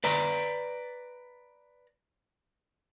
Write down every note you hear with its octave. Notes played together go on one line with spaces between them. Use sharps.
B4 D5 A#5